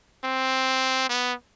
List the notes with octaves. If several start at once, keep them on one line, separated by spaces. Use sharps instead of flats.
C4
B3